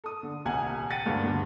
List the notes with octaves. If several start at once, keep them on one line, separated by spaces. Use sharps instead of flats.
A4 D#6
D3
D#1 C2 F#5 G#5 G#6
F#5 G5 A6 C#7 D#7
D2 G2 A#2 C#3 A#3
G2 D3